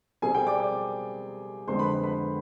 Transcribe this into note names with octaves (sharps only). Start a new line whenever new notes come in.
B2 G3 C4 G#4 G#5
G5
D5 D6
D5 D6
F2 D3 G#3 B3 C5 C6
B4 B5
B4 B5